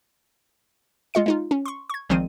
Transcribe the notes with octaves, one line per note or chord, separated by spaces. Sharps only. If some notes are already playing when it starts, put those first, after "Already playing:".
G#3 F4 D#5 C#7
G#3 D#4 F4
C#4
C6 C#6
C#6 G#6
A#1 D#3 F3 G#3 C4 D#7